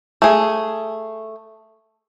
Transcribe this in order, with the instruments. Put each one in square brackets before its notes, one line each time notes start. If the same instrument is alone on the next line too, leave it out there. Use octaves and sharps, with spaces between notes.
[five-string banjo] A3 G#4